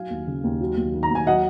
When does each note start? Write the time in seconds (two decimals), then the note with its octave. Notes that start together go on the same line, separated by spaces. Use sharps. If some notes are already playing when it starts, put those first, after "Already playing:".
Already playing: F#3 F5 G#5
0.10 D#2
0.27 C#3
0.44 D#2
0.61 F#3
0.77 D#2
0.94 D#3
1.03 A#5
1.10 D#2
1.15 G#5
1.27 F#3 D#5 F#5